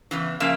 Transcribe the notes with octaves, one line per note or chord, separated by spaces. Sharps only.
E2 C#3 E3
C#3 F3 A#3 E5